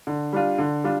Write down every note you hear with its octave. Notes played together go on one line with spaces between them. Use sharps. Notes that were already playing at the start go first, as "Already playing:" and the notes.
D3
G3 D4 F4
D3
G3 D4 F4